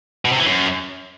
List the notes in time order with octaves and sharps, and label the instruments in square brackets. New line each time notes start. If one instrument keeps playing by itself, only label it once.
[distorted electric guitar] B2
C3
E3
F#2